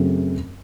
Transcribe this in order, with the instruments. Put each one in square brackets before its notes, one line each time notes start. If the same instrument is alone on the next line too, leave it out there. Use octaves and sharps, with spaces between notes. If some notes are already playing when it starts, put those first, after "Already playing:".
Already playing: [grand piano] F#2 C#3 F#3 A3 C4